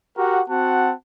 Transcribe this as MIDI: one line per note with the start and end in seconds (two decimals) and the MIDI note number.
0.17 0.41 66
0.17 0.41 67
0.17 0.41 70
0.17 0.41 78
0.49 0.92 60
0.49 0.92 66
0.49 0.92 78
0.49 0.92 81